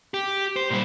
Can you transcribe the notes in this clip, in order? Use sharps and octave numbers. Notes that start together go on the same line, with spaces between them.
G4
C5
A#2 G3